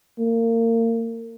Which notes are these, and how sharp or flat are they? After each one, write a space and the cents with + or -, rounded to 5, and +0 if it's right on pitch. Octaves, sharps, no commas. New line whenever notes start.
A#3 -30